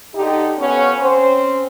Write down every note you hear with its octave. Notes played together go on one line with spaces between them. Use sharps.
D3 D#4 G4
F2 B3 C#4
C4 C#4 C5